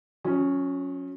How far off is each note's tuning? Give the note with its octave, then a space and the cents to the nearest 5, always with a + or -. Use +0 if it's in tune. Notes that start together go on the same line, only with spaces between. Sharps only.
F#3 -45 C#4 +0